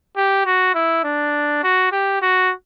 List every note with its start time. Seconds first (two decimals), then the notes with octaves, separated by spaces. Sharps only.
0.17 G4
0.46 F#4
0.74 E4
1.04 D4
1.63 F#4
1.92 G4
2.22 F#4